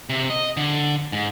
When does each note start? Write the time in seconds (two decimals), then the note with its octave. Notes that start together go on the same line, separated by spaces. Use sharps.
0.10 C3
0.30 D#5
0.57 D3
1.12 G#2